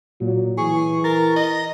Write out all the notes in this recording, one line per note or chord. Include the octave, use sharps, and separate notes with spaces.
A#2 F#3
E3 G#4 C#6
A#4 A6
D#5